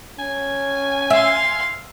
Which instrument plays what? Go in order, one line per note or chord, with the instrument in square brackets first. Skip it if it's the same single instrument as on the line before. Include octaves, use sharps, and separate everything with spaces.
[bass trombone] C#4 [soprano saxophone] G#5
[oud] E5 [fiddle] F5 C6